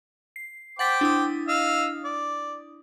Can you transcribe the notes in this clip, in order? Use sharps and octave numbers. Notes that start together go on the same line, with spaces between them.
C7
C5 F#5 G5 D6 A6 B6
D4 E4 D#6
D#5 F5 E6
D5